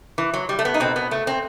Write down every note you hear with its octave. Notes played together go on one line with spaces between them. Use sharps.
E3
F#3
G3
A3
B3
D#4
B2 C4
B3
A3
C4